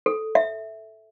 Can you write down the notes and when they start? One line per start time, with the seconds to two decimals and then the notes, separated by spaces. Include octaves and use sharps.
0.06 A4
0.35 E5